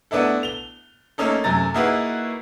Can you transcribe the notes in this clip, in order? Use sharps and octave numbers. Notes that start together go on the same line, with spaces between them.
A3 B3 D4 E4 A4
F7 G7
A3 A#3 C#4 D#4 A4
F#2 C3 A3 A#5 A6
A#3 D#4 E4 F#4 G#4 B4